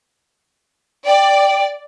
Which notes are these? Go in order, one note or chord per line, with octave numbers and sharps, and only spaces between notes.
D5 G5